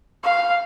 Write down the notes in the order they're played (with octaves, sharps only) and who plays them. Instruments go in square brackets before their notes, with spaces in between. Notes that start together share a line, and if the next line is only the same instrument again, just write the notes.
[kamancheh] F5